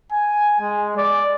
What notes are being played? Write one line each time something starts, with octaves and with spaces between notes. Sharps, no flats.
G#5
G#3
D5